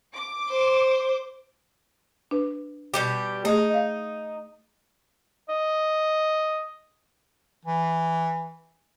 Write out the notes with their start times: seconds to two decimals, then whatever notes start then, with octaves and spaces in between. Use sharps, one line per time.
0.13 D6
0.50 C5
2.31 D4 B4
2.94 B2 G3 G4
3.45 A3 D#4 G#4
3.70 D#5 F5
5.49 D#5
7.65 E3